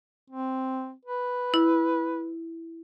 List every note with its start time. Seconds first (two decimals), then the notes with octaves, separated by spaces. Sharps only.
0.30 C4
1.05 B4
1.54 E4